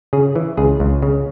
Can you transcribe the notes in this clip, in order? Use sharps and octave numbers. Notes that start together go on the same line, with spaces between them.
C#3 G#4
E3
C#2 G#4
C#2
C#3